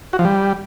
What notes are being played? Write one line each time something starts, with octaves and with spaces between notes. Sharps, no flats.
F#4
F3
G3